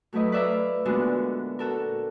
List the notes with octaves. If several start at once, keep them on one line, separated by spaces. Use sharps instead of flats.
F#3 A3 E4 B4 D#5
B4 D5 E5 F5 A#5
A#2 D3 G#3 B3 D4 F#4
F#4 A4 A#4